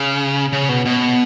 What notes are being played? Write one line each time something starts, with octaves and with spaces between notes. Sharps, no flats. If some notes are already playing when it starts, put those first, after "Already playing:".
Already playing: C#3
C#3
B2
B2